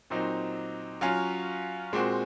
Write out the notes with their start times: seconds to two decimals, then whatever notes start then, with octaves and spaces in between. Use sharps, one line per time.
0.10 A#2 F#3 C4 D#4
1.01 F#3 C#4 F4
1.93 A#2 G#3 C4 F#4